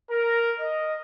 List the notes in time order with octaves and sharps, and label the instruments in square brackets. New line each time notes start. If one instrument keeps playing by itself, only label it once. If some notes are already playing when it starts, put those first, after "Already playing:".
[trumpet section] A#4
D#5